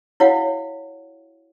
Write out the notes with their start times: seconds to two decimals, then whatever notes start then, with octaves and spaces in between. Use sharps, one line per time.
0.20 E4 F#4 C#5 F5 F#5